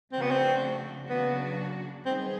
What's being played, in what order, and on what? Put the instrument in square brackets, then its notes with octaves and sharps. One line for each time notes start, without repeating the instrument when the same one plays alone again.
[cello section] C#3 F3 A3 D4 F#4 [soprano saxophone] C4
[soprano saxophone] B3
C4
[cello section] C#3 F#3 A#3 D4 F#4 [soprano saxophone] B3
[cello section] D#3 G3 B3 D#4 G#4 [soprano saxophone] C4